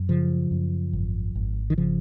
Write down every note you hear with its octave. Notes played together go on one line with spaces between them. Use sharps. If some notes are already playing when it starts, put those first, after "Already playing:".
Already playing: F#2
C#3 F3
F#2
G#1
G#1
D#3
C#3 F3